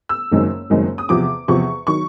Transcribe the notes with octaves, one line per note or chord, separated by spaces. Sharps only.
E6
F#1 F#2 D#3 G#3 C4
F#1 F#2 D#3 G#3 C4
D#6
E2 C3 F3 D6
E2 C3 F3 C#6
D#3 F#3 C#6